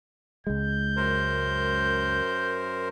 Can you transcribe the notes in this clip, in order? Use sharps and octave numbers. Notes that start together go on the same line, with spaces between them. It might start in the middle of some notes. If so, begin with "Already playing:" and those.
C#2 G#3 G6
F#2 A#4 C5